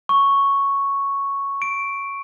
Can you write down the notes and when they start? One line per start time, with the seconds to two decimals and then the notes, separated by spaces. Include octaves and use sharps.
0.09 C#6
1.62 D7